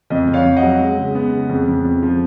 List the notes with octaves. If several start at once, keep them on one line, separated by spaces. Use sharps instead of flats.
F2 D#5
F2
C#5 F5
F2
D#5 F#5
F#3
G#3
C#3
B3
C#3
F2
F2
F2
F3